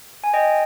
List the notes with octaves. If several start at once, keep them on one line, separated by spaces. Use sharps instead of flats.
G#5
D#5 G5